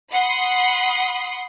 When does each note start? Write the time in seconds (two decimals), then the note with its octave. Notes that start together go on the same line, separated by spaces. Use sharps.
0.11 F#5 B5 C6 D#6